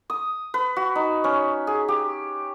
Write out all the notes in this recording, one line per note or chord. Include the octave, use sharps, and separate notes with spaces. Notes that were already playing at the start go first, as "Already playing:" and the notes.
D#6
B4
F#4
D#4
C#4
G#4
G4